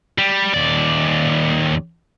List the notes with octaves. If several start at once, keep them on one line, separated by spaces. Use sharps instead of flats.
G3
D#2 D5